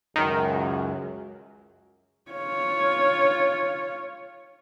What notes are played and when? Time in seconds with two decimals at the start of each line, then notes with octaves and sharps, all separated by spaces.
0.16 C#2 F#2 D#3
2.31 F4 C#5